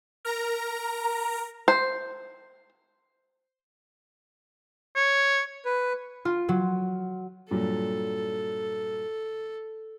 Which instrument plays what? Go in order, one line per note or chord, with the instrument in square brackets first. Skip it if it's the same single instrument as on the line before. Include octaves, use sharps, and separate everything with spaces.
[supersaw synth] A#4 A#5
[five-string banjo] C5
[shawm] C#5
[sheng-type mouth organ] B4
[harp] F4
F#3
[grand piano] G2 A#2 F#3 [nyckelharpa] A4